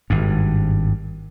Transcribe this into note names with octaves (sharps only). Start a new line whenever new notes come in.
G#1 G2